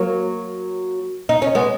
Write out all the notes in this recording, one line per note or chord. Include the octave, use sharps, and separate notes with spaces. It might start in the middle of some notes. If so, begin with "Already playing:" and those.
Already playing: F#3 A#3
D#4
C#4
G#3 B3